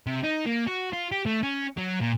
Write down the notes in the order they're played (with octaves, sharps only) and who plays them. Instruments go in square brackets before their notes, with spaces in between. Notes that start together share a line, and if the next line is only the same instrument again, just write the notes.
[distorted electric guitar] C3
D#4
A#3
F#4
F4
G4
A3
C#4
F#3
A#2